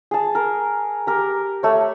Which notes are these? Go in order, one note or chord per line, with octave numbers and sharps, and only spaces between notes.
G#4 A5
A#4
G4 A#4
A3 C#5